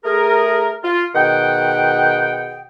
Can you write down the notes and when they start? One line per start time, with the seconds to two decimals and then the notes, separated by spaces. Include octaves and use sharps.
0.04 A3 G#4 A#4
0.84 F4
1.15 B2 D#3 G#4 F#5 G5